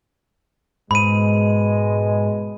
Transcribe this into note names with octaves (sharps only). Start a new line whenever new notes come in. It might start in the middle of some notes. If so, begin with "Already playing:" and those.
G#2 B2 G#3 B5 D#7